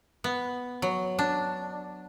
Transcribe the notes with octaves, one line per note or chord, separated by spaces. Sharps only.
B3
F#3
D4